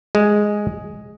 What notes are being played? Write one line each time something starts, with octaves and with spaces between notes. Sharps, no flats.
G#3